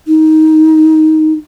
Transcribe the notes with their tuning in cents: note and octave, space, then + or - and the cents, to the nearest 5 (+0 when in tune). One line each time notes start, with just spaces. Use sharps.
D#4 +15